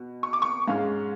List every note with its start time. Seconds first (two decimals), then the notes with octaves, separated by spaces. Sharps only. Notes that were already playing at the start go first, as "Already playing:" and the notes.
Already playing: B2
0.23 C#6
0.33 D6
0.42 C#6
0.68 G#2 G#3 C#4 F5